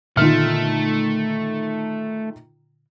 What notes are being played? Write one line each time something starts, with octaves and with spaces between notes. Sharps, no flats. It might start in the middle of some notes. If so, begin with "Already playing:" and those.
A#2 D3 D#3 A3 B3 F4 F6